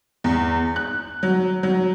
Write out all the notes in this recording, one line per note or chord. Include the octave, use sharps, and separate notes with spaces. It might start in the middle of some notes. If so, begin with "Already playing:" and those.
E2
F#6
F#3
F#3